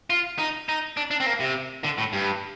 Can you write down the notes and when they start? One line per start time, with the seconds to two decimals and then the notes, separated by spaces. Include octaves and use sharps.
0.10 F4
0.39 D#4
0.69 D#4
0.97 D4
1.11 D4
1.20 C4
1.26 A#3
1.40 C3
1.84 D3
1.98 A2
2.13 G2